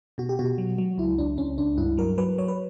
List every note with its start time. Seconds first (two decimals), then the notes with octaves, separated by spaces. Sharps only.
0.18 B2 F#4
0.29 G4
0.39 B2 F#4
0.58 F#3
0.78 F#3
0.98 C#2 E4
1.18 C#2 D4
1.38 C#2 C#4
1.58 C#2 D4
1.77 G2 E4
1.97 F#3 A#4
2.18 F#3 B4
2.38 F#3 C#5
2.48 B4